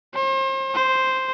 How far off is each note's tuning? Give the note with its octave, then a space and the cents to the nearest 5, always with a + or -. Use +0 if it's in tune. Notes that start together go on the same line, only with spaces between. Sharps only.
C5 +40
C5 +0